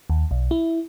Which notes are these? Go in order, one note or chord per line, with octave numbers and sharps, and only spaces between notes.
D#2
B1
E4